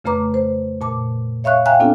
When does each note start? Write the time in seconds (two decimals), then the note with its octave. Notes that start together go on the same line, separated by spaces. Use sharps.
0.04 F2 C#3 A3 B4 A#5 D6
0.34 C5
0.81 A#2 A5 D6
1.44 C#5 E5 F5 C#6 F#6
1.66 E5 F5 G5 G#5 A#5 F#6
1.80 B3 C4 D4 F4 A4